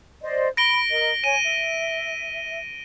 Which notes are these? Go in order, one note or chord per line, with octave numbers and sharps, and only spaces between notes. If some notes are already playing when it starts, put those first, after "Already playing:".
C5 D5 D#5
B5 A#6 D7 G7
A#4 D#5
C#5 G#5 D#7
E5